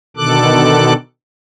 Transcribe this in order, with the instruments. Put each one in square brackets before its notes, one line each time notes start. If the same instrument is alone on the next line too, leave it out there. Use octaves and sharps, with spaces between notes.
[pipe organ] B2 D3 D#3 A4 D6 F#6